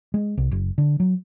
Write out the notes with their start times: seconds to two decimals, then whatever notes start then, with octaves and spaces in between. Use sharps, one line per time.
0.14 G#3
0.38 C2
0.51 F#1
0.78 D3
1.00 F#3